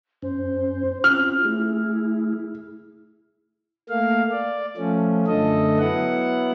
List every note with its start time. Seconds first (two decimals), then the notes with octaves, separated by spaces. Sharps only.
0.22 F#2 C#4 C5
1.04 C4 C#4 F4 F6
1.45 A3 E4 G#4
3.89 A3 A#3 F5
4.31 D5
4.77 F3 A3 C#4
5.27 F#2 D3 A3 A4 D#5
5.79 F#3 B3 E4 F#5